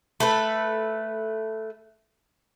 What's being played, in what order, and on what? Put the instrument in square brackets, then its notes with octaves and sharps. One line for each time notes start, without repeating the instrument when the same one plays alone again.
[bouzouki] A3 A4 B4